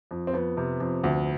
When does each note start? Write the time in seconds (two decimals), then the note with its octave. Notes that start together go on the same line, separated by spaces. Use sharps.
0.11 F2
0.27 C4
0.33 F2 B3
0.57 C3
0.80 F2
1.04 D2